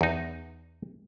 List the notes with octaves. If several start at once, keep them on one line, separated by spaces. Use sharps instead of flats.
E2 D#4